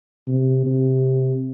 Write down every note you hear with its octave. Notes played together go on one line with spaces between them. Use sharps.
C3
C3